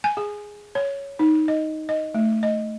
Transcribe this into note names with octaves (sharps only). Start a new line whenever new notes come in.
G#5
G#4
C#5
D#4
D#5
D#5
A3
D#5